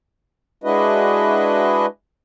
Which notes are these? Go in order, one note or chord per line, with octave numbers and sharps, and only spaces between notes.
G#3 D4 E4 F#4 B4 D#5